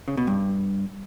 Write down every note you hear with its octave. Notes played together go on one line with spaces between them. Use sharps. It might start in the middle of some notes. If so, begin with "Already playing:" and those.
C#3
B2
G2